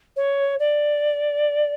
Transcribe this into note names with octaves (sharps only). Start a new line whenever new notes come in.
C#5
D5